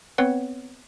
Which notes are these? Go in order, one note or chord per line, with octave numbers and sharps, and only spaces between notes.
B3 C4 B4 C#5 F#5